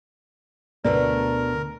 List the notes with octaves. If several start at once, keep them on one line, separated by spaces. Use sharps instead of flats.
D2 B2 D3 A3 A#4 B4 D5